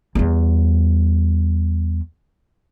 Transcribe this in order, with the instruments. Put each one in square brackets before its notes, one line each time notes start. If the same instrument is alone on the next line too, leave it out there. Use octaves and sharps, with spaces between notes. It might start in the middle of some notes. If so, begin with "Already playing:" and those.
[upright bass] E2 G3